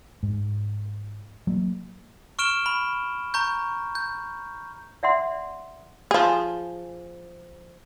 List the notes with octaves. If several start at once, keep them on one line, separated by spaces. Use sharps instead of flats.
G#2
F#3 A#3
C#6 F6 D7 E7 G7
B5
A#5 C#6 G6
G6
D5 E5 F#5 C6
F3 G#4